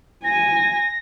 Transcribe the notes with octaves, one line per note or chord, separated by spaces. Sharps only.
G#5 A#6